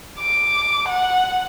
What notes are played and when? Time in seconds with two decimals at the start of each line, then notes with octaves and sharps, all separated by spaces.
0.20 D6
0.89 F#5